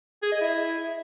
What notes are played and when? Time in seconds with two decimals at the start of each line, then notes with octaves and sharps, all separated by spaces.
0.22 G#4
0.32 D#5
0.41 E4